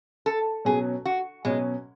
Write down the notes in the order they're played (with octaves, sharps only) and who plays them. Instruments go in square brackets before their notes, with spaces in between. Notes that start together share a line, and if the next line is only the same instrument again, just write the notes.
[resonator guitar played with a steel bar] A4
[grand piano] B2 F#3 C#4 [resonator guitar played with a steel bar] G#4
[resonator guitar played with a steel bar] F#4
[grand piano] B2 F#3 C#4 [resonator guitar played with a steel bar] G#3